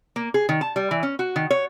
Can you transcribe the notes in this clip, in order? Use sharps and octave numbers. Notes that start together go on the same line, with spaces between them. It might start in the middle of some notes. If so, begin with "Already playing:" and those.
A#3
G#4
D#3
A5
G3
E3
C#4
F#4
D#3
C#5